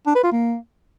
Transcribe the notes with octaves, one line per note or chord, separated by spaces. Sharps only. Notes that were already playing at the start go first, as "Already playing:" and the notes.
D4
B4
F4
A#3